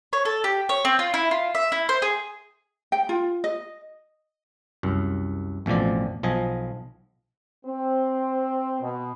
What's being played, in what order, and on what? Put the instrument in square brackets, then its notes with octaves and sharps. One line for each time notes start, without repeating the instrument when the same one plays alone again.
[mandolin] C#5
A4
G4
C#5
C4
F4
E4
F4
E5
E4
C5
G#4
[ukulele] G5
F4
D#5
[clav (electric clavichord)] C2 F#2
A1 F2 B2 F3 D5
B1 F3 D#5 G#5
[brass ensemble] C4
B2